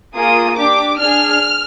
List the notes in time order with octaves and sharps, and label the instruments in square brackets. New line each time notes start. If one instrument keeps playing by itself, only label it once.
[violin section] A#3 F4 G#4 D#6
D4 G4 D6
D4 G#4 F6